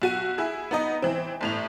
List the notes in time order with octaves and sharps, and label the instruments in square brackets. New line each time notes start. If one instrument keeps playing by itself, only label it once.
[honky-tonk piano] B1 F#4 D#7
E4 G#4
B3 D#4 D#5
E3 C4
G1 A2 F7